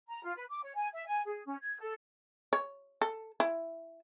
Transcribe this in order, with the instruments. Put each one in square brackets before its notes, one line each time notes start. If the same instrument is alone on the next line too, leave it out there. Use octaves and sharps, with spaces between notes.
[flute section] A#5
F4
B4
D6
C#5
G#5
E5
G#5
G#4
C#4
G#6
A4
[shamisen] C#5
A4
E4